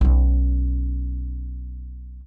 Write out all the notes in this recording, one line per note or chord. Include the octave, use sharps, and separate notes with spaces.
B1 C#4